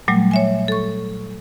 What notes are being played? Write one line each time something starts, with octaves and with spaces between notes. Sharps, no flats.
A#2 F#3 G3 A3
C#5 E5 G#5
A4 C#6